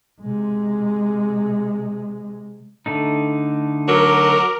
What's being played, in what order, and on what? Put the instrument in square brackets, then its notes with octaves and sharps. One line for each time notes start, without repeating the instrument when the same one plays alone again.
[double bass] C3 G#3
[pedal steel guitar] D3 A3 D#4
[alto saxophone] F#3 [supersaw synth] A#4 [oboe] D6